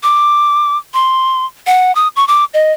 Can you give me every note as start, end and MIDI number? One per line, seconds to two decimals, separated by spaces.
0.03 0.78 86
0.94 1.46 84
1.67 1.94 78
1.95 2.08 87
2.16 2.26 85
2.28 2.45 86
2.54 2.73 75